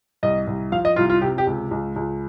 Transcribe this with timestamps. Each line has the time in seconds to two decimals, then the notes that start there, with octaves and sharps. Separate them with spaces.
0.23 C2 D#5
0.47 C2
0.72 F3 F5
0.85 D#5
0.96 C2 F4
1.10 F4
1.22 C3 G4
1.38 G4
1.47 C#2
1.71 C#2
1.96 C#2